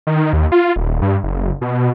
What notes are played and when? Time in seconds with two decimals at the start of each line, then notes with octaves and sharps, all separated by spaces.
0.07 D#3
0.33 D#2
0.52 F4
0.76 D#1
1.02 G2
1.24 F#1
1.61 B2